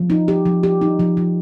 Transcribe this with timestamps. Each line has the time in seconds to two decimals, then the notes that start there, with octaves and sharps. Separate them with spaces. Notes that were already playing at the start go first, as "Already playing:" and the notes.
Already playing: F3
0.10 D#4
0.28 G4
0.45 F3
0.63 G4
0.81 D#4
0.99 F3
1.17 F3